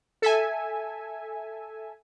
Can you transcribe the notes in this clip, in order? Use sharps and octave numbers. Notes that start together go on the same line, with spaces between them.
A4 E5 G#5